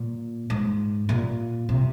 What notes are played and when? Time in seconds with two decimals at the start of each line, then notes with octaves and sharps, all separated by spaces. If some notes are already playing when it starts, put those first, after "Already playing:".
Already playing: A#2
0.50 G#2
1.09 A#2
1.69 C3